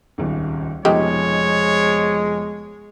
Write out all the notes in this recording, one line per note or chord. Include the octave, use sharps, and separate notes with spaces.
D#1 G#1 C#2
F1 B2 D#3 F3 G#3 A3 G4 C#5